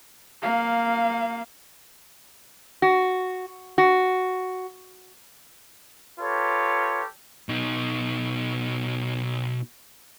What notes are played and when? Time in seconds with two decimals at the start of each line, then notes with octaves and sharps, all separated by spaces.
0.42 A#3 F5
2.82 F#4
3.78 F#4
6.20 F4 G4 A4 B4 C#5
7.49 B2 D#4